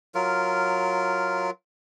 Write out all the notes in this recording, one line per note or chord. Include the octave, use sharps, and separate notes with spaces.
F#3 F4 A#4